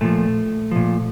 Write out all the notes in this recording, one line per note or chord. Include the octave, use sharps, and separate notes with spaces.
A#2 F3 A3
A#2 F3